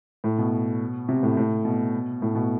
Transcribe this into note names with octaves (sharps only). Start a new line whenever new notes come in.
A2
B2
C3
A2
A2
B2
A2
B2